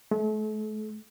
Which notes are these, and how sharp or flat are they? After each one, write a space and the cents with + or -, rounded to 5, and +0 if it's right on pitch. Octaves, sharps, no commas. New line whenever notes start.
A3 -40